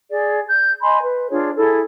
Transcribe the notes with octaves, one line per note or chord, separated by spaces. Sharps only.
G#4 D5
G6
D#5 G#5 B5 C6
B4
D4 F4 G#4 C#5
E4 G#4 A4